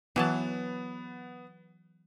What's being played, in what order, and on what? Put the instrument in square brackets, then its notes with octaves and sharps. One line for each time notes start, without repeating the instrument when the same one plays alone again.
[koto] E3 F#3 A5 [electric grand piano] B3